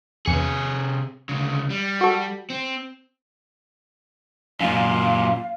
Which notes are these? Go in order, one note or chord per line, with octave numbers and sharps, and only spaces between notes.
E2 C3 G#4 C#7
D2 C#3
G3
F#4 A4
C4
F#2 A#2 F5